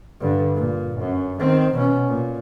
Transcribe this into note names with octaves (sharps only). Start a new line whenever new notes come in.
G2 D3
A#2
F#2
D#3 C4
B2 C#4
A#2